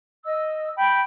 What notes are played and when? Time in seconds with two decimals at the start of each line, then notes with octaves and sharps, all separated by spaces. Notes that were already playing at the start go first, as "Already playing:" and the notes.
0.24 D#5 E6
0.76 G5 B5